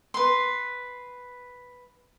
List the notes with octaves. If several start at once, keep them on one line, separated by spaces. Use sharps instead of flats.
B4 C6